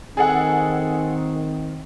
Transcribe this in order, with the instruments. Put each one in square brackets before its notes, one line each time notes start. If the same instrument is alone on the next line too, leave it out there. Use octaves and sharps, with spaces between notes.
[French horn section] D#3 C4 [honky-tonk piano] G#4 A4 F#5